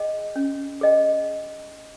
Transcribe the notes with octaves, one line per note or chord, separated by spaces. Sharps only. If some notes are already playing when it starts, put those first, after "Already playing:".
Already playing: G#4 D#5 G5
C#4
G#4 D#5 G5